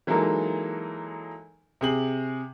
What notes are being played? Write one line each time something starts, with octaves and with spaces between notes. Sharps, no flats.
E3 F#3 G#3 A#3 D#4 A4
C3 G#4 F#7